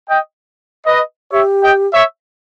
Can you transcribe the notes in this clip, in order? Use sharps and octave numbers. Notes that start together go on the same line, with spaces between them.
D#5 G5
B4 D#5
G4 C#5 E5
D#5 G5
C#5 E5